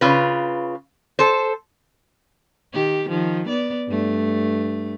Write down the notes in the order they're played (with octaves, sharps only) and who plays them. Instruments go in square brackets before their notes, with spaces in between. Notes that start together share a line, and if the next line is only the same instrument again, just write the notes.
[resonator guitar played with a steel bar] C#3 F4 B4
A4 C5
[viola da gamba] D#3 G4
D#3 F3
B3 D5
G2 A3